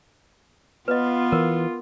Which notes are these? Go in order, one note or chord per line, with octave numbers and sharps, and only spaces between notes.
B3 F4 B4 D#5
E3 A#4